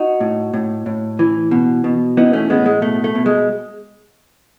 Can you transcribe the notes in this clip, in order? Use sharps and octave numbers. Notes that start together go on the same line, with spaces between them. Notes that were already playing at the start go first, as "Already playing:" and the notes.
Already playing: D#4 F#4
A2
A2
A2
E3
B2
B2
E3 B3 D#4
A3 C#4
A2 G#3 B3
G#3
B2 A3
A3
B2
G#3